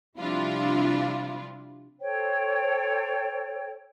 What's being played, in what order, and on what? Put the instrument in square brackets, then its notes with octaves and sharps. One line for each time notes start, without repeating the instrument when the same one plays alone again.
[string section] C3 F3 G3 D4 E4 F4
[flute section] A4 C5 C#5 G5